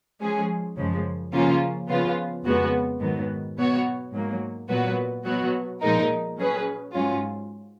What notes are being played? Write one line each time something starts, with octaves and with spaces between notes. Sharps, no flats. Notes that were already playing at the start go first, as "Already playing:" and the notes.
F3 G#3 C#4 G#4
F#2 C#3 F3 G#3
C#3 F3 A#3 C#4 F4
C#3 F3 B3 F4
F2 C#3 G#3 B3 F#4
G#2 D#3 F#3 B3
B2 F#3 B3 F#4 C#5
G#2 F#3 A#3
A#2 F#3 B3 F#4 B4
B2 F#3 B3 F#4
A#2 F3 G#3 D#4 A#4
F#3 C#4 G#4 B4
G#2 F#3 C#4 F4